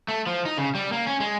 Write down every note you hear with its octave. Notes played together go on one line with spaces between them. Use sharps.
A3
F3
D#4
C#3
G3
A#3
C#4
G#3